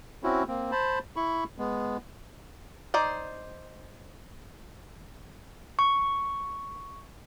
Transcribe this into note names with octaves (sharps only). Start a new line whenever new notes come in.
C4 C#4 E4 F#4
A#3 C4
C5 A5 B5
E4 B5 C#6
G#3 B3
D#4 C5 D5
C#6